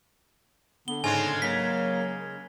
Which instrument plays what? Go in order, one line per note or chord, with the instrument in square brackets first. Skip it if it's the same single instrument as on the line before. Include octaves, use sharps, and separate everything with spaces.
[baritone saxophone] D3 [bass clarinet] B3 [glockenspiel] G7
[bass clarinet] G#2 [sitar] C#3 G#3 [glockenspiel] G#5
[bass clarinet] F#3 [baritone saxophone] A#3 [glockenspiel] B6